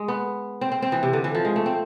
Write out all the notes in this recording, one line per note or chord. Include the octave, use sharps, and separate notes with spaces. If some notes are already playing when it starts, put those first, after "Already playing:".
Already playing: G#3
B3
C4
C4
C4
E3
C3
D3
E3
F3
G#3
A3
C4